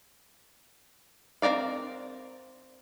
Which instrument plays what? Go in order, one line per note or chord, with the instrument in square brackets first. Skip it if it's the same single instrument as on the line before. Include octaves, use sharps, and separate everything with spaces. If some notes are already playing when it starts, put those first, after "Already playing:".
[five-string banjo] C4 E4 A#4 D5 F5